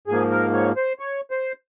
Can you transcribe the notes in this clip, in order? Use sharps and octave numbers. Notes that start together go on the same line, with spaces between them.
G#2 F3 A#3 G#4
A#4
C#5
C5
C#5
C5